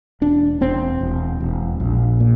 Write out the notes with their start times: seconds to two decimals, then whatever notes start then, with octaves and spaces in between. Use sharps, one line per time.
0.21 E1 D4
0.61 E1 C4
1.01 E1
1.40 E1
1.80 A#1
2.20 A#2